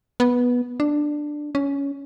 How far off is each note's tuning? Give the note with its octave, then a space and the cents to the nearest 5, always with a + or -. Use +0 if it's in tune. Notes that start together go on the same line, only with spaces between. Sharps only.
B3 -10
D4 +10
C#4 +15